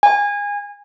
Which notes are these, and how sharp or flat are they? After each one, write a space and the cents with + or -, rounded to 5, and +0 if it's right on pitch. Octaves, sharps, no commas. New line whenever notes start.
G#5 -25